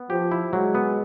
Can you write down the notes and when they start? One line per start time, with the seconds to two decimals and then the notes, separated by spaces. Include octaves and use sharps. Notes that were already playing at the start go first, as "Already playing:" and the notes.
Already playing: B3
0.10 F3 G4
0.31 E4
0.53 F#3 G#3
0.75 B3